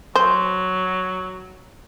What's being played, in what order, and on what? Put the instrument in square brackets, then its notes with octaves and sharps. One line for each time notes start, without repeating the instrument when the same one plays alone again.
[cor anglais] F#3 [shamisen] C5